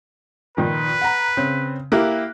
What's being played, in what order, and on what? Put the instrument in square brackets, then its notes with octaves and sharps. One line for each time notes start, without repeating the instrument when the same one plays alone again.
[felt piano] A#2 D#3 F3 [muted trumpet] B4
[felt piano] F#5 A#5
C#3 C4
[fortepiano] A#3 E4 G4 [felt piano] F#6